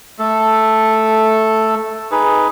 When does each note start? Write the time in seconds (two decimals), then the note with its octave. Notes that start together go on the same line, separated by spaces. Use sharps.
0.19 A3 A4
2.12 D#4 G#4 B4